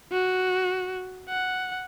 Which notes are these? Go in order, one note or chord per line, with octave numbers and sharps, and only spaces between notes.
F#4
F#5